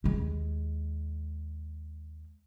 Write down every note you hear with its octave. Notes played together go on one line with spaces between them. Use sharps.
D#2 G#3